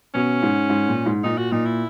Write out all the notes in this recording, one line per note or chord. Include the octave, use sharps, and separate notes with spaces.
B2 C#4
G#2
G#2
A#2
G#2
A#2 D#4
F#4
A#2 D#4
E4